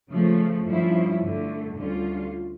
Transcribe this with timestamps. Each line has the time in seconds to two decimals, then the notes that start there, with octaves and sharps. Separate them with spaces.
0.10 C#3 F3 A3
0.66 G2 F3 C#4 E4
1.20 G2 D3 A3
1.76 D2 D3 G3 C#4 F4